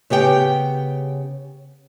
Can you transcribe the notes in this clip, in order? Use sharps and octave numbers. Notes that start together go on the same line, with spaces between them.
C#3 B3 G4 G5